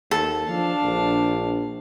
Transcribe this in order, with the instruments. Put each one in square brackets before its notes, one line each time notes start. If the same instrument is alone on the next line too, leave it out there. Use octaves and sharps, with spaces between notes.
[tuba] D#2 [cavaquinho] A4
[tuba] F3 [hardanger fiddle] D4 F5
[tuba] A#1